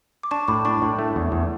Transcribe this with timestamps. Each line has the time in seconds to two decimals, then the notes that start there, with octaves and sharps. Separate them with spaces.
0.23 D6
0.31 D4 A5 C#6
0.48 A2 B5 D6
0.65 D4 A5 C#6
0.82 A2
0.99 A3
1.16 E2
1.32 E2